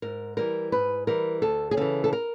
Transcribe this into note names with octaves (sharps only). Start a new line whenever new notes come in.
G#2 A#4
E3 G3 A#4
G#2 B4
E3 G3 A#4
D2 A4
G#4
C#3 E3 A4
A4
A#4